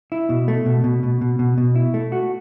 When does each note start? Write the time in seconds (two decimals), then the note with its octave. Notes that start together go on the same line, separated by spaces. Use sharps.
0.12 E4
0.29 B2
0.48 A3
0.66 B2
0.84 B2
1.03 B2
1.21 B2
1.39 B2
1.58 B2
1.76 E4
1.94 A3
2.12 F#4